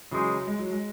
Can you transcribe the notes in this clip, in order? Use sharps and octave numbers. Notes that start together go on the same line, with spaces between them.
C#3 E3 F#3 G#3 D#4
G#3
F#3
G#3